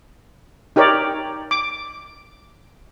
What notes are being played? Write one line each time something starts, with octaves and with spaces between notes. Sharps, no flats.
D#4 G4 A#4 C#5 D5
D6